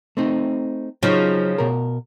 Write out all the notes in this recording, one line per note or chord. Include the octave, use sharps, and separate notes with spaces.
A3 C4 D#4
C#3 F3 F#3 D#4
B2 A#4